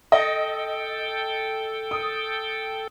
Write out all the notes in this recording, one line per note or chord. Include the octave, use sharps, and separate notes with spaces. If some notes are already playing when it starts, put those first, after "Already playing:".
A4 D#5 G5
D#6